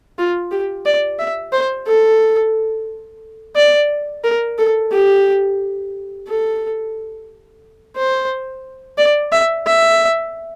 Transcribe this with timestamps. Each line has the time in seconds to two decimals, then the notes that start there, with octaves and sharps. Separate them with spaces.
0.18 F4
0.51 G4
0.86 D5
1.19 E5
1.53 C5
1.87 A4
3.56 D5
4.24 A#4
4.58 A4
4.91 G4
6.28 A4
7.97 C5
8.98 D5
9.32 E5
9.66 E5